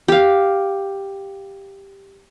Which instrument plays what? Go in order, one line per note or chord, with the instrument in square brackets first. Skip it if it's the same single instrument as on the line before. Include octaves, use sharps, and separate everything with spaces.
[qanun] G4 F5